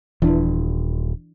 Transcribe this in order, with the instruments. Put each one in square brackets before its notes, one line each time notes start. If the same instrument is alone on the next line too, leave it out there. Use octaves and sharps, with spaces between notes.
[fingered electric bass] D#1 [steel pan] E3 D4